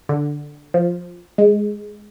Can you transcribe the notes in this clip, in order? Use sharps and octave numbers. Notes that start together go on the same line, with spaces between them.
D3
F3
G#3